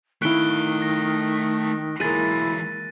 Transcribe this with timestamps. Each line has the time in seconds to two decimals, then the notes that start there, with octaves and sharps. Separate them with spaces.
0.22 D#3 A3 E4 F5 C#6 F#6 D7 G7
0.82 A#6
2.00 E3 F#3 G#3 A#3 E4 A6 D#7